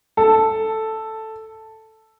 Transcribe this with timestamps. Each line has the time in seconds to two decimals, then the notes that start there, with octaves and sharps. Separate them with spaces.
0.17 A4